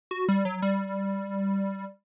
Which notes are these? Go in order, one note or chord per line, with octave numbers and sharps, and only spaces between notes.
F#4
G3
F#3
G3